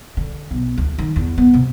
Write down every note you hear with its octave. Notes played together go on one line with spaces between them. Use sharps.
D3
B1
D2
D#3
E2
B3
C3